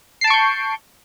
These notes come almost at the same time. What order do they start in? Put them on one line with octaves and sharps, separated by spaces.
C7 A5 D7 C#6 G6